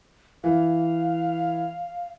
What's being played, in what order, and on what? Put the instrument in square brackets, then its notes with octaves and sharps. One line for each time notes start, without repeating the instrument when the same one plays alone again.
[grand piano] E3 [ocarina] F5